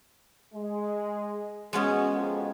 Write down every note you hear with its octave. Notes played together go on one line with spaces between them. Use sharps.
G#3
G#3 B3 C#4 F#4 G#4
F2